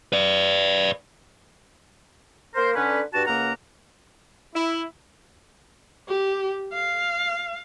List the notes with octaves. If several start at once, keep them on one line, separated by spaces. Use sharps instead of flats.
B4 D5
A#3 A#4 C5
D3 C#4 B4
G2 F#4 A5
C#2 C#3 A#3 A#4 F#5 A#5
E4
G4
F5